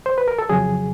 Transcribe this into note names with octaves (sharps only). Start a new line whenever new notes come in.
C5
B4
A#4
A4
F2 C#3 F#3 G#4